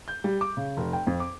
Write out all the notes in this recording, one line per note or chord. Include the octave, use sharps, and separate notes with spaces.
G6
G3
D6
C#3
F1
G5
F2
D6